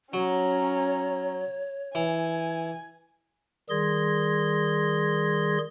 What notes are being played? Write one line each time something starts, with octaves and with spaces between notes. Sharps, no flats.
F#3 C#4 C#5 A#5
E3 G#5
D#3 G3 G#4 C6 G#6 A#6